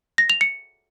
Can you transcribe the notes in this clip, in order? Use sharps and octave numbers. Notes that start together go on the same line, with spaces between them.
A#6
F7
C#7